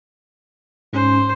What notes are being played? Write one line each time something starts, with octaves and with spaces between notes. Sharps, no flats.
G#2 C#4 C5